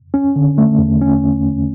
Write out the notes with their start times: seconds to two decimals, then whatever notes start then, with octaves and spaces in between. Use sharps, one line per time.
0.14 C#4
0.36 D3
0.58 A3
0.79 E2
1.02 C#4